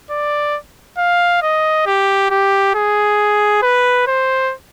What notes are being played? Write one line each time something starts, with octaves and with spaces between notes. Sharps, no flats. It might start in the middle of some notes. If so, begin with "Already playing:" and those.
D5
F5
D#5
G4
G4
G#4
B4
C5